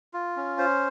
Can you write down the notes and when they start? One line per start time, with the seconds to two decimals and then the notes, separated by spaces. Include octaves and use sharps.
0.14 F4
0.36 C#4
0.58 C5